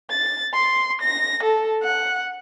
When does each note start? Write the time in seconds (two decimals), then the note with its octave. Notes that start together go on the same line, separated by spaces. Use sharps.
0.10 A6
0.54 C6
1.02 A#6
1.43 A4
1.83 F#5